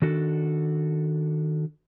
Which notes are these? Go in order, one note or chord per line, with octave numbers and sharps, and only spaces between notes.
D#3 D4 F#4 A4